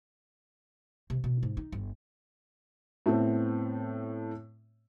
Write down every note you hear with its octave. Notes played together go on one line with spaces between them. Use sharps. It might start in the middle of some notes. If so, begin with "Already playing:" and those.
C3
B2
G#2
D#4
G1
A2 A3 B3 C4